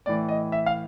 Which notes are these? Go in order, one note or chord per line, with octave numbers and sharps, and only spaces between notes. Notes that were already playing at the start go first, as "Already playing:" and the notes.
A2 E3 D5
D#5
E5
F5